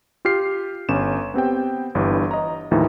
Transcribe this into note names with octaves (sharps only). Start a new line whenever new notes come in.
F4 G4 F6 C7
G1 C#4 E7
B3 C4 G4 G5
G1 G2 E3
D#5 A#5
D#2 A2 E3 F3 D#4